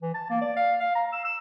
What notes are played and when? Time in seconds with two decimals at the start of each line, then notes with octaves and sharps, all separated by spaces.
0.02 E3
0.14 A5
0.30 A#3
0.41 D5
0.57 F5
0.80 F5
0.96 A#5
1.13 E6
1.25 E6